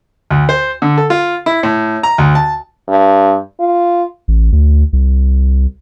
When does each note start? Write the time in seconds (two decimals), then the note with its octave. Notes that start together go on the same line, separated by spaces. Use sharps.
0.31 D2
0.49 C5
0.82 D3
0.97 A4
1.10 F4
1.46 E4
1.63 A2
2.03 A#5
2.18 D2
2.35 A5
2.89 G2
3.60 F4
4.28 A1
4.52 D2
4.93 C2